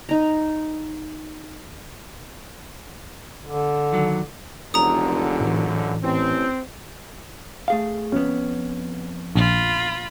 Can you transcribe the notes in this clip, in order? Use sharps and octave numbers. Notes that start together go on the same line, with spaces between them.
D#4 A#5
D3
D#3 F#3
F1 C#2 F#2 D3 A#5 D#6
A2 E3
A1 C4
A3 G#4 F5
F2 B3 C#4
A#1 F4 B5